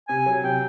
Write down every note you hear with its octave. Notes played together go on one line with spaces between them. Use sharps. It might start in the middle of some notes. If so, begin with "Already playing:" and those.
C3 G#5
F#3
C3 G5